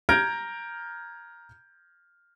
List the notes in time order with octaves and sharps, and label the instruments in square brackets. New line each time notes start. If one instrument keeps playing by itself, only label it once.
[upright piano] A#5 F6 G6 G#6 A#6 D7